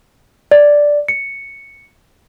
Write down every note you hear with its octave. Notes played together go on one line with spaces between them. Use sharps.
D5
C#7